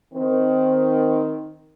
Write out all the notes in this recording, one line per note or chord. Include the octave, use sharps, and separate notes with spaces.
D#3 C4